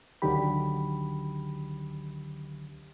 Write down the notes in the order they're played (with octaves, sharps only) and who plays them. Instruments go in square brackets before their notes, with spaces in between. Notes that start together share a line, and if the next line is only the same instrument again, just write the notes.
[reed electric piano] C#2 D3 D#3 F#3 G4 B5